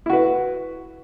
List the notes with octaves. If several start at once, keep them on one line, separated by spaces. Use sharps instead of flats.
E4 F#4 B4